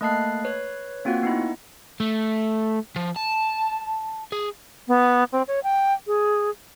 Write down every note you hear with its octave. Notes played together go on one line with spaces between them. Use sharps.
A3 A#3 D#5 A5 F#6 C7
B4 C#5
A#3 C4 F4 F#4 F#5
B3 D#4 E4
A3
F3
A5
G#4
B3
C4
C#5
G5
G#4